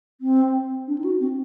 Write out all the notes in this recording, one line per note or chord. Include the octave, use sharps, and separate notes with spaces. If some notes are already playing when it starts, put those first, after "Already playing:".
C4
D4
D#4
F#4
C4